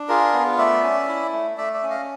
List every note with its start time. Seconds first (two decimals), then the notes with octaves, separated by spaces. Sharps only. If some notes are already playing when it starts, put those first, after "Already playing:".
Already playing: D4
0.09 F4 G#4 A#4
0.33 B3
0.58 A3 D5 E5
0.83 C#4
1.08 E4
1.33 A3
1.57 A3 D5 E5
1.74 D5 E5
1.83 C#4
1.90 D#5 F5